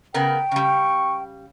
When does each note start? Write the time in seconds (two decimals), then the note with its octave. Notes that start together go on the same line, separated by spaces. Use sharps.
0.14 C#3 B3 A#4 G5
0.51 C#3 G3 C#6